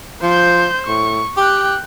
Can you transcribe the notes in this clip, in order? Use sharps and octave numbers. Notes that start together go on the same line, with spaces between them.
F3 C5 G6
A2 C#6
G4 G5 F#6